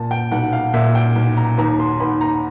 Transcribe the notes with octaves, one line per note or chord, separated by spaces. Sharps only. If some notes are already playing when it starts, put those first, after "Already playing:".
Already playing: A#2 A5
G5
B1 F#5
F5
A#2 E5
G5
B1
A#5
D#2 A#5
C6
D#2 B5
A#5